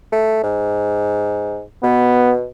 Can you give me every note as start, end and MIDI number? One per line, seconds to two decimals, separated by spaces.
0.12 0.39 57
0.44 1.63 44
1.83 2.46 47
1.83 2.34 59